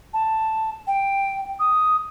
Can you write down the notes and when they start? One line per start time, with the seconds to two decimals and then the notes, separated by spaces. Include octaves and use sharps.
0.13 A5
0.87 G5
1.59 D#6